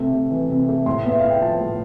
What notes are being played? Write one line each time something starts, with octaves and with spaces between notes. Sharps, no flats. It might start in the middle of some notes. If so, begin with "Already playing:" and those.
Already playing: C3 A3
C3
E3
C3
A3
A2 C6
B3 E5
E4 F5
G5
F3 A5
A2